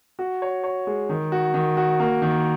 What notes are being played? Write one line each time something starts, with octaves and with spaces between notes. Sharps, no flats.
F#4
C#5
C#5
G#3
D#3
F#4
D#3
F#4
A#3
D#3